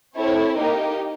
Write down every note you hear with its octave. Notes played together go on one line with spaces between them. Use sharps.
C4 E4 A4 C#5
A#3 D#4 G4 A#4